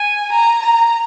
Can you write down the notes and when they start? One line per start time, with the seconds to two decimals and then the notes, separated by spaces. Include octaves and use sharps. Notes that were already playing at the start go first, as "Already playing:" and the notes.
Already playing: G#5
0.32 A#5
0.63 A#5